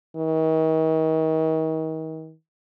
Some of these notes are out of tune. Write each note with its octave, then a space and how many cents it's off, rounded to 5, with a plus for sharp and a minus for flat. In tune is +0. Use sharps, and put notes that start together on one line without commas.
D#3 +40